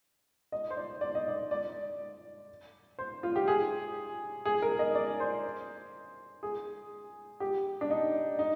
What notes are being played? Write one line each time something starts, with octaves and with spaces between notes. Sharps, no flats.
D#5
C5
D5
D5
D#5
D5
D5
C5
F4
G4
G#4
G#4
A#4
D#5
D5
C5
G#4
G4
D4
D#4
D#4